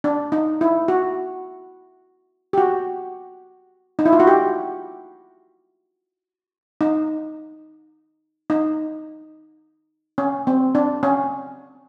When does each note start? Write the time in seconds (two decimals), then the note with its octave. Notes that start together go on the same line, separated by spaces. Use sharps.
0.04 D4
0.32 D#4
0.61 E4
0.88 F#4
2.53 G4
2.58 F#4
3.99 D#4
4.06 E4
4.13 F4
4.20 F#4
4.27 G4
6.81 D#4
8.50 D#4
10.18 C#4
10.47 C4
10.75 D4
11.03 C#4